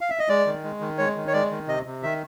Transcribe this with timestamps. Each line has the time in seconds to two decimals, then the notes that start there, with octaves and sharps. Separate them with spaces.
0.01 F5
0.10 E5
0.19 D#5
0.29 G#3 D5
0.46 D#3
0.64 G#3
0.81 D#3
0.98 G#3 C#5
1.16 D#3
1.27 C#5
1.33 G#3 D5
1.51 D#3
1.68 C3 D#5
1.85 C3
2.03 D#3 E5